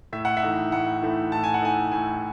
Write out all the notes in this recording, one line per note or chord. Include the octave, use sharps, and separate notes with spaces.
A2 E5
F#5
E5
E3 A3 D#4
A2 F#5
E3 A3 D#4
A2 A5
G#5
F#5
E3 A3 D#4 G#5
A2 G#5